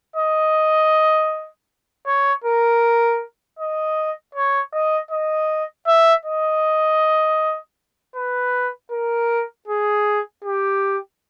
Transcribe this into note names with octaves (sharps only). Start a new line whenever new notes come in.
D#5
C#5
A#4
D#5
C#5
D#5
D#5
E5
D#5
B4
A#4
G#4
G4